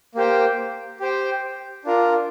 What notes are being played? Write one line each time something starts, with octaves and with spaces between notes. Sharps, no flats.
A#3 G4 C5 G5
G4 C5 G5
D4 F4 A#4